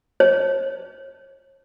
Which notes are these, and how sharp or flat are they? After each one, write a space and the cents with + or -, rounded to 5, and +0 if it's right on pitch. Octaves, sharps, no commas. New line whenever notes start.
C#5 -40